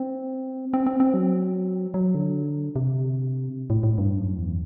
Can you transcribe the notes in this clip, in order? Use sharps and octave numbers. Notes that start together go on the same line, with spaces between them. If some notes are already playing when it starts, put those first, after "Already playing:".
Already playing: C4
C4
C4
C4
F#3
F#3
D3
C3
A2
A2
G2
F#2
E2